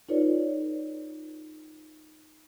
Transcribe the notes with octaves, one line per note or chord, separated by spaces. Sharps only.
D#4 F4 A4 B4 C#5 D5